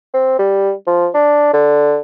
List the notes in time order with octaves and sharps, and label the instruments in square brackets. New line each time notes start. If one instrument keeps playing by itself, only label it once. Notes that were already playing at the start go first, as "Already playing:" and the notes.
[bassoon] C4
G3
F3
D4
D3